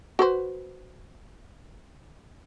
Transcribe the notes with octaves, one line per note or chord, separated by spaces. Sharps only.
F#4 B4 C5